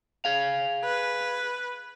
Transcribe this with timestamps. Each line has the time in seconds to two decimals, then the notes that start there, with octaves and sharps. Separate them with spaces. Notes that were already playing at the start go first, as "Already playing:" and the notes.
0.25 G#4 F5
0.84 B4